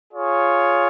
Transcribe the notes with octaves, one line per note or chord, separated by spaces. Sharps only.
F4 G#4 C#5